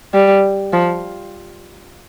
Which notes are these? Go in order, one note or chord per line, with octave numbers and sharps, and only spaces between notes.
G3
F3